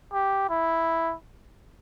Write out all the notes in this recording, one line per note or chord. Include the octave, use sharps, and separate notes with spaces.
G4
E4